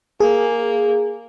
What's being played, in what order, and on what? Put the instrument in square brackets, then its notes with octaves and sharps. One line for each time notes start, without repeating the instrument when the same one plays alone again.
[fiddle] A#3 [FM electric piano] G#4